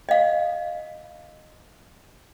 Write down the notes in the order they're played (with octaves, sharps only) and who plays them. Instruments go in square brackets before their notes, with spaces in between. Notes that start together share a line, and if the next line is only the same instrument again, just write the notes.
[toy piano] D#5 F5